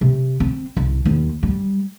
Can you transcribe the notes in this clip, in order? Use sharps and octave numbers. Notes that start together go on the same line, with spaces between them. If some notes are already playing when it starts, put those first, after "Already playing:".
C3
C4
C2
D#2
G3